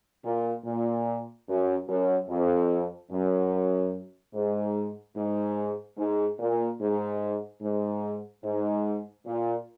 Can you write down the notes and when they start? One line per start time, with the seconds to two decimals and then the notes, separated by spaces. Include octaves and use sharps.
0.24 A#2
0.65 A#2
1.48 F#2
1.88 F#2
2.29 F2
3.11 F#2
4.34 G#2
5.16 G#2
5.98 G#2
6.39 A#2
6.80 G#2
7.61 G#2
8.44 G#2
9.26 A#2